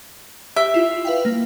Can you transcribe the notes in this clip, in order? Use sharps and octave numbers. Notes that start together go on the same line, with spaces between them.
G4 E5
E4 F4
B4 F5 G5
A#3